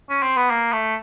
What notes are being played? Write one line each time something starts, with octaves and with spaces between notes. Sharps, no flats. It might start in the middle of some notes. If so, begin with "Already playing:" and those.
C#4
C4
B3
A#3
A3